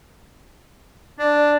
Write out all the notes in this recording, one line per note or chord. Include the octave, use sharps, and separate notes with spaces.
D4 D5